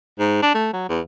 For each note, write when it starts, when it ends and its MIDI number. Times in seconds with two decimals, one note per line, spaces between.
0.20 0.41 44
0.43 0.52 62
0.55 0.70 57
0.73 0.85 54
0.89 1.01 40